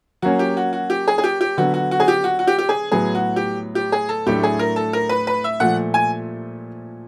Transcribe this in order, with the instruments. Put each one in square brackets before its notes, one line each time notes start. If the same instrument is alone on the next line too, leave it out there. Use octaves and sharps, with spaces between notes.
[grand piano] F#3 A#3 C#4 [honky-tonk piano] F#4
[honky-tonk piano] G4
F#4
F#4
G4
G#4
G#4
G4
G4
[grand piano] D3 F#3 B3 [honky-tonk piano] F#4
[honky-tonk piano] F#4
F#4
G#4
G4
F#4
F#4
G4
G4
G#4
[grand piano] A2 F#3 B3 [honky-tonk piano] G#4
[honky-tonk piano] F#4
G4
G4
G#4
A4
[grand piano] A2 F#3 A3 D4 [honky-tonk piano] G4
[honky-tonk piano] G#4
A#4
A4
A#4
B4
B4
E5
[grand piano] A#2 F3 A3 [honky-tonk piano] F#5
[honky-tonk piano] G#5